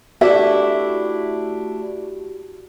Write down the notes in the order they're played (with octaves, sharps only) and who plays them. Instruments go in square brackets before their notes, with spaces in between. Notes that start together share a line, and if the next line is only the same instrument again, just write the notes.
[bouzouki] A3 D4 E4 [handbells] F#4 G4 [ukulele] E5